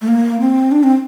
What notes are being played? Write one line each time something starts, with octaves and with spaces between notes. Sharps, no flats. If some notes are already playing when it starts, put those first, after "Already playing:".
A3
A#3
C4
D4
C4